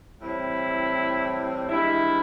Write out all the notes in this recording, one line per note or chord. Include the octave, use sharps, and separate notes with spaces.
A2 E3 G3 C4 E4
G2 E3 G#3 E4